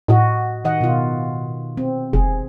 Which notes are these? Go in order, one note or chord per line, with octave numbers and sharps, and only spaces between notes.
A2 F#4 D#5
D#3 D#5 F#5
B2 F4
C4
F1 G#4